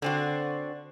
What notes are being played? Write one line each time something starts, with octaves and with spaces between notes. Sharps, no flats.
D3 C4 F#4